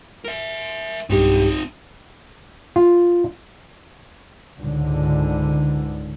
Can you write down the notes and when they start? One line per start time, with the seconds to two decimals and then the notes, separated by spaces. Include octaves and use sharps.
0.25 A#4 E5
1.10 B1 G2 C4 D#4 G4
2.76 F4
4.58 C#2 G#2 D3